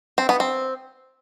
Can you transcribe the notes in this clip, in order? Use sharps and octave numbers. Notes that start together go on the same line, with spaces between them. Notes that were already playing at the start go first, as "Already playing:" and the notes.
C4
B3
C4